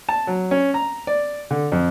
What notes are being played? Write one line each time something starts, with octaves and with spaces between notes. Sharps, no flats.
A5
F#3
C#4
A#5
D5
D3
F2